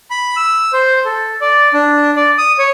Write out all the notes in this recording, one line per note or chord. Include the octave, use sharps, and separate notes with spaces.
B5
E6
C5
A4
D5
D4
D5
D#6
C#5